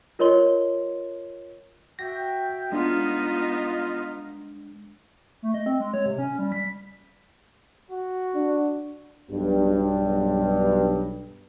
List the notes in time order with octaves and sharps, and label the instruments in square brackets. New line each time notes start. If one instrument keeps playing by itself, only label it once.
[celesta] F4 A#4 C#5 D#5 C6 G7
[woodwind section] F#4 E5 G5 [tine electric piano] A#6
[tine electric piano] G#3 D4 [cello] B3 D#4 [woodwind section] F4
[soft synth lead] A3
D#5
C4
G#3
C#5
C3
C#4
G3
B6
[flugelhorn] F#4
[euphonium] D4
[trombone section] B1 G2